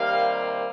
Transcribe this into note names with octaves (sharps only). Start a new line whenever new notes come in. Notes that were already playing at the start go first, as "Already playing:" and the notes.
Already playing: C3 D#3 G3 A#3 F5